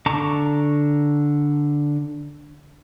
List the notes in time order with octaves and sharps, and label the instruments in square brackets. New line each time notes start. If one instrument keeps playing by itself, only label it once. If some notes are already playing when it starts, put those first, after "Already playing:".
[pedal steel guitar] D3 A5 A#5 C#6 D6